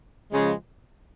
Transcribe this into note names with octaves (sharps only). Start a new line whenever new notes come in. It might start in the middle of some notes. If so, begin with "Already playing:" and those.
C#3 F3 G#3